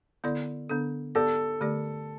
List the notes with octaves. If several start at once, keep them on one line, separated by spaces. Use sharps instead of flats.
D3 B3 E4 A4 D5
D3 B3 D4 A4
B3 G4 A4 D5
D3 A3 G4 D5